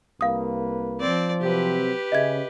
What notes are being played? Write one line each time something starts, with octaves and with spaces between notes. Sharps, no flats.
C2 A#3 B4 F5 D#6
F3 C4 D5
C3 F#3 C4 G4 B4
C#3 D#5 E5 G#6